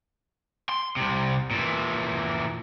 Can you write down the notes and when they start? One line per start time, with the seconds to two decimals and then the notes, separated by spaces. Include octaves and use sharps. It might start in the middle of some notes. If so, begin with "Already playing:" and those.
0.69 C6
0.96 C2 C3
1.51 A#2 E3